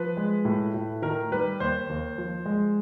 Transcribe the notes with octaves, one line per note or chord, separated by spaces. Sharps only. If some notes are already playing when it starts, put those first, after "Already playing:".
Already playing: F3 B4
G#3
A2
A2
D#3 A#4
G3 B4
D#2 C5
D#2
F3
G#3